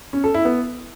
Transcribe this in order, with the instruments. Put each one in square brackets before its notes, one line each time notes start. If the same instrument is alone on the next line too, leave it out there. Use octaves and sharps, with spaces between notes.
[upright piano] C#4
A4
E4
B3